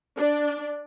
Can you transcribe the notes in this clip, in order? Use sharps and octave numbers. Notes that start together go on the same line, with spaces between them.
D4 D5